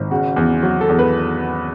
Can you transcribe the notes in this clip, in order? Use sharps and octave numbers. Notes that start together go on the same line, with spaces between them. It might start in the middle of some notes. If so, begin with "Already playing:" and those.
Already playing: G#1
C#3 F#4
E2
F#3 F#4
A4
E2
B4